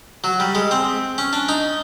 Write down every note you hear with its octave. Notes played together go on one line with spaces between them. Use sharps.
F#3
G3
G#3
C4
C#4
D4
D#4